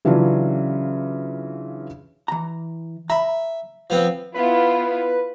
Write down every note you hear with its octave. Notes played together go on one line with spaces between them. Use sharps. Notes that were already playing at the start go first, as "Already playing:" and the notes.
C#3 E3 F#3 C#4 D4 F4
E3 A#5
E5 A#5 B5
F3 B3 C4
B3 E4 F4 B4